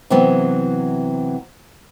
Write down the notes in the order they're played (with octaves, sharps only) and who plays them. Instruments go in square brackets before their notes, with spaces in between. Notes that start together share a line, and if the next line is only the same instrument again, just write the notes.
[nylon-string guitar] C3 E3 F#3 B3 C4